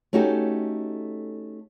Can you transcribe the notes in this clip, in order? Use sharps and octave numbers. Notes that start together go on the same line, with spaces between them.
A3 C#4 D#4 F#4 G4 A4